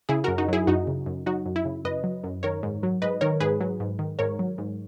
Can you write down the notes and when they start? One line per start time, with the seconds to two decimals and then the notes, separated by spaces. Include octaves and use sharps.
0.09 C#3 E4 G#4
0.24 F#2 F#4 A#4
0.38 D#4 F#4
0.48 F#3 E4 G#4
0.67 F#2 D#4 F#4
0.87 C#3
1.06 F#2
1.26 F#3 D#4 F#4
1.46 F#2
1.56 E4
1.65 C#3
1.85 F#2 B4 D#5
2.04 F#3
2.24 F#2
2.43 D#3 A#4 C#5
2.63 G#2
2.83 F#3
3.02 G#2 B4 D#5
3.21 D#3 A#4 C#5
3.40 G#2 G#4 B4
3.61 F#3
3.80 G#2
3.99 D#3
4.19 G#2 A#4 C#5
4.39 F#3
4.58 G#2